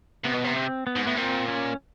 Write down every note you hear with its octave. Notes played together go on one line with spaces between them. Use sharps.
C3 B3
B2
C3
C4
B3
G#2
A2 B3
A#2 C4
C#4